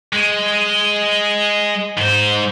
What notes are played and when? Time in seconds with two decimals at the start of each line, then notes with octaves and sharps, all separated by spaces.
0.13 G#3
1.97 G#2 C5